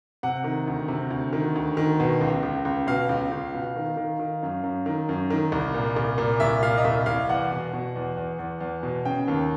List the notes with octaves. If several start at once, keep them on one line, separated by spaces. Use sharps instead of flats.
C3 F#5
D#3
D2
C3
D2
D#3
D2
D#3
B2
C#2
C#2
C#2
B2 F5
C#2
C#2
B2
D#3
D#3
D#3
F#2
F#2
D#3
F#2
D#3
C2
A#2
C2
A#2
C2 E5
A#2 F5
D#5
C2 E5
C2 F5
E2 F#5
B2
B2
E2
E2
E2
E2
B2
C#3 G5
D#2